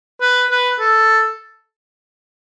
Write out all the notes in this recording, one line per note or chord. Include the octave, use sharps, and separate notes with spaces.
B4
B4
A4